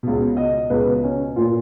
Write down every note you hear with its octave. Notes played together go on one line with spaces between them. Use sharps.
C#2 B2
D#5
C#2 B2 B4
C#4
A#2 F4